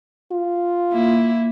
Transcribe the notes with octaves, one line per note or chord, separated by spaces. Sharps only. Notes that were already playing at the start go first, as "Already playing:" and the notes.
F4
A#3 E4